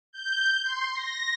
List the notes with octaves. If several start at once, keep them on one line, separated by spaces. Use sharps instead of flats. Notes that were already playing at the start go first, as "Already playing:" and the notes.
G6
C6
A#6